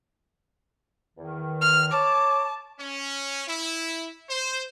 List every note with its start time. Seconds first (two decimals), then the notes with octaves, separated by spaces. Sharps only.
1.18 E2 D#3
1.61 F6
1.92 C#5 A5 D6
2.80 C#4
3.48 E4
4.29 C5